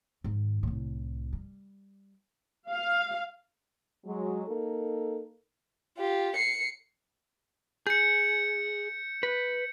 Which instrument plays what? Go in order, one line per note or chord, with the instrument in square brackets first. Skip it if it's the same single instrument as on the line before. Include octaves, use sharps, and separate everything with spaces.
[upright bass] G#2 D#3
C2 A2
G3
[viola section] F5
[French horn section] F#3 G#3
A#3 D#4 A4
[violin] F4 G4
C7 C#7
[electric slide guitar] G#4 [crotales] G6 C#7
[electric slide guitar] B4